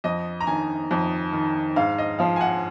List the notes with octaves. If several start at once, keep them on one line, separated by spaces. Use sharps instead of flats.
F2 D#5
A#5
D#3 G#5
F2
D#3
G#2 F5
D#5
F3 F5
G#5
F#5